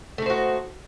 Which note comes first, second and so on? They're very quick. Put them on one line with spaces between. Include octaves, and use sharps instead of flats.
A3 D#4 C5 F#4